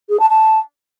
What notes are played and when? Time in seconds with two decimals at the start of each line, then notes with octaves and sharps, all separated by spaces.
0.09 G#4
0.20 A5
0.30 A5